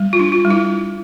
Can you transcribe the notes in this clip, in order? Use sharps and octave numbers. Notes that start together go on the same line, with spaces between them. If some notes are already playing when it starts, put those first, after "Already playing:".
Already playing: G3
F4
D4
F4
G3
E4